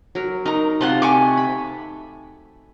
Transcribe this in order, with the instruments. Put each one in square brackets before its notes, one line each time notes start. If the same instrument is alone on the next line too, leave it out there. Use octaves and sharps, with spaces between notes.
[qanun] F#3 A#4
[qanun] D#4 [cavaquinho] A#4 A#5
[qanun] C3 A5 [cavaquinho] F4 F#5 C6
[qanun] A3 [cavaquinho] G#5 C#6 D6
[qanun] B5